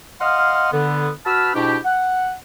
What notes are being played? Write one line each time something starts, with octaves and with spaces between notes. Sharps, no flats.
D#5 F5 F#5 C6 D#6 F6
D3 B3
F#4 B4 A5 B5 E6 F6
G#2 B2 D4 E4 G4
F#5